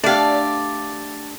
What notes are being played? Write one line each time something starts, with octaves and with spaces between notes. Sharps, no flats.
A3 D4 G4 D5 F5